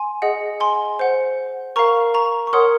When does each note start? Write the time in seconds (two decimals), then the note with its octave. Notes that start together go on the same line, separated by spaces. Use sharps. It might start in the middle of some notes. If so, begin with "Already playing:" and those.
Already playing: G#5 C6
0.22 G#4 D#5 F#5
0.60 G#5 C6
0.99 C5 F#5
1.76 A#4 F5 A#5 C#6
2.14 A#5 C#6
2.47 C#6
2.53 A#4 C#5 F#5 C6 D#6